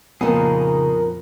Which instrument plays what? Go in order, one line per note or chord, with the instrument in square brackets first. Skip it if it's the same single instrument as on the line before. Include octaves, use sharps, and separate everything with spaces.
[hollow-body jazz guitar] F2 A#2 F3 [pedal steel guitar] C#3 D#4 G#4 [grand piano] B3 [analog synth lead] A#4